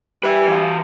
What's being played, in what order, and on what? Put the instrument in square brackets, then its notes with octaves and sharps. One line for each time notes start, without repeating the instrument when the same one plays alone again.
[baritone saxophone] G3 [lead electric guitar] B4 E5
[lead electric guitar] E3 F5